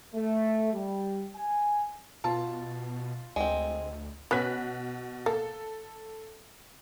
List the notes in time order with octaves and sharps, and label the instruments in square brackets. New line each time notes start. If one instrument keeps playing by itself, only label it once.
[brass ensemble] A3
G3
G#5
[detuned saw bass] B2 [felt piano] F4 A5
[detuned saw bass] D2 [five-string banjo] G#3 C4
[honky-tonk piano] B2 F#6 B6 [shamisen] B3 C#4
[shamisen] A#3 [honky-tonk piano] A4